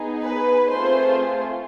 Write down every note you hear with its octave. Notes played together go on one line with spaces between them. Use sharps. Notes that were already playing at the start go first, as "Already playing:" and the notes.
Already playing: B3 D#4 G#4
B4
A3 C4 F4 G#4 C5